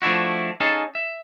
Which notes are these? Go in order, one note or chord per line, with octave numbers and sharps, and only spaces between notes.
F3 A3 D4 E4 F#4
C#4 D#4 G#4 A4 F5 A5
E5